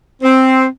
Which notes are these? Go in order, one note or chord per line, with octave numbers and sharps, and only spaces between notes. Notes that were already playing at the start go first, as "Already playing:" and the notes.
C4